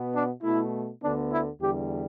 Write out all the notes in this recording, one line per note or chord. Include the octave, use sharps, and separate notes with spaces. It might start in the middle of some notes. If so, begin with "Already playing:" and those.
Already playing: B2 B3
D4
B2 A3 E4
D2 D3 B3 D4
E4
E2 D3 G3 G4